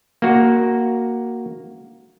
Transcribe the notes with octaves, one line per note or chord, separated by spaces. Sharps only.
A#3 F#4